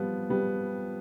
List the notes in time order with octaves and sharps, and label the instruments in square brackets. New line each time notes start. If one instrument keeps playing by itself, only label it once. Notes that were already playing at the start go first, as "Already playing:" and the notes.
Already playing: [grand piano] F3 B3 [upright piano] G3
[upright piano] G3 [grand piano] B3